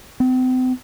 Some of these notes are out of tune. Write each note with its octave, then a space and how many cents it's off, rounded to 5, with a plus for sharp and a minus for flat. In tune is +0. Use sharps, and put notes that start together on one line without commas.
C4 -40